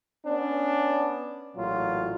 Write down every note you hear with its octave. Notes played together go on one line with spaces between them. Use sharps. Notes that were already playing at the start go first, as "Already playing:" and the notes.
B3 C#4 D4
A1 A#2 F#3 F4